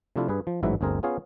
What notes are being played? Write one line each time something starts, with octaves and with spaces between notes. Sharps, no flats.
C3 F3 A3 D4 E4 F4
G2 G#4 B4
F3
A1 G#2 F#3 E4 B4 E5
G1 D2 C4 G#4 A#4
B3 C#4 F4 G#4 C#5 F5